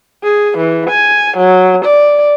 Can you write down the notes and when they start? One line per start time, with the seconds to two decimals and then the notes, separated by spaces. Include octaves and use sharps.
0.24 G#4
0.58 E3
0.90 G#5
1.37 F#3
1.85 D5